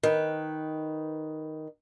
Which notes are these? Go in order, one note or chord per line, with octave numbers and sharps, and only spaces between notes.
D#3 B4